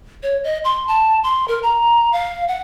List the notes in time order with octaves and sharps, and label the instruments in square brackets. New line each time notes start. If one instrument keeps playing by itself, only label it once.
[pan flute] C#5
D#5
C6
A5
C6
A#4
A#5
F5
F#5